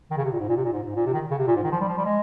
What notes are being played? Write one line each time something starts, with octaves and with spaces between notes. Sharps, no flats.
D#3
C#3
C3
A#2
G#2
A#2
C3
A#2
G#2
G#2
A#2
C3
D#3
C#3
C3
A#2
G#2
D#3
F3
G3
F3
G3
G#3